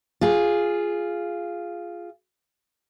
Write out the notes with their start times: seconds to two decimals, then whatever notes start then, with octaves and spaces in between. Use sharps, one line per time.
0.21 F4 G#4